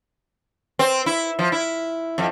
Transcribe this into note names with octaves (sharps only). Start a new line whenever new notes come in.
C4
E4
F3
E4
F2